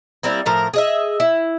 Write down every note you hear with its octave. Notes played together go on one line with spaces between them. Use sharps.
G3 A#3 C4 E4
A2 F3 A#4
G#4 D#5 E5
E4